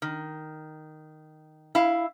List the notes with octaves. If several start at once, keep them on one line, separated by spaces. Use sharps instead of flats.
D#3
E4 F5